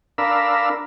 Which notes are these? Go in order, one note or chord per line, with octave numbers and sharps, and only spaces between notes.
D4 A#4 F5 B5 E6